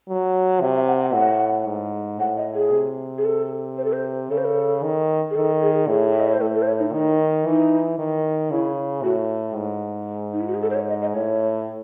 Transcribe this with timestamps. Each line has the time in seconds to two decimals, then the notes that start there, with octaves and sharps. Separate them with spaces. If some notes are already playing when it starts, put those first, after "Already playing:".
0.09 F#3
0.61 C3 E5
0.75 E5
0.88 F#5
1.01 F#5
1.14 A2 F#5
1.67 G#2
2.19 A2 F#5
2.37 D#5
2.55 G#4
2.72 C3
3.18 G#4
3.25 A4
3.77 C5
3.84 A4
3.93 C5
4.30 C#3 A4
4.38 C5
4.45 A4
4.83 D#3
5.31 G#4
5.36 D#3 A4
5.62 G#4
5.88 A2 G#4
6.11 E5
6.20 D#5
6.27 C#5
6.33 C5
6.40 A2 A4
6.54 A4
6.62 C5
6.68 C#5
6.80 D#4
6.93 D#3 D#4
7.46 E3 D#4
7.99 D#3
8.51 C#3 E4
9.03 A2 F#4
9.56 G#2
10.33 D#4
10.40 E4
10.48 F#4
10.54 G#4
10.62 A4
10.70 C5
10.75 C#5
10.89 D#5
11.01 D#5
11.14 A2 C#5